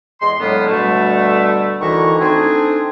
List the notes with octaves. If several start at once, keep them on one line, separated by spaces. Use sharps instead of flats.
E2 G#3 D#5 C6
A2 D3 F#3 G#3 A#3 B3
B2 D3 G3 A3
D2 D#3 E3 E4 A#5 C#6
A3 C4 D4 D#4 G#4